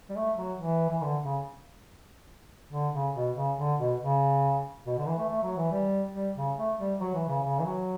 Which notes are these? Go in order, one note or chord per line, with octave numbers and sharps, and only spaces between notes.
G3
A3
F#3
E3
E3
D3
C#3
D3
C#3
B2
C#3
D3
B2
C#3
B2
D3
E3
A3
A3
F#3
E3
G3
G3
C#3
A3
G3
F#3
E3
C#3
C#3
E3
F#3